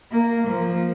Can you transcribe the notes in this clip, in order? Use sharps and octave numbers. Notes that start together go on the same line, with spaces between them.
A#3
F3